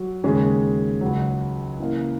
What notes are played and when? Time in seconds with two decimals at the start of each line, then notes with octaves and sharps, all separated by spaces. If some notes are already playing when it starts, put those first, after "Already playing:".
Already playing: F#3 F#4
0.24 D#2 C#3 G#3 C#4
1.01 C#2 C#3 F#3
1.80 C#3 E3 A#3